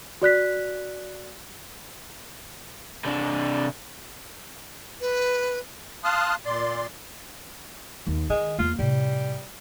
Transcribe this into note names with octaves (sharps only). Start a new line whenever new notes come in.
F#4 D5 F#6 B6
C3 D4
B4
F5 A5 C6 D#6 F6 F#6
A#2 D5 C6
D#2
D#3 G#3
E2 A#3 F4
A2 C3 G3